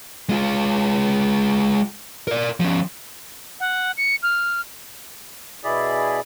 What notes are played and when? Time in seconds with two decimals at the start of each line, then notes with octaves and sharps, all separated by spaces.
0.29 G#3 F4
2.27 A#4 D5
2.60 F3 C#4
3.60 F#5
3.97 C#7
4.23 F6
5.64 B2 E4 G#4 D5 B5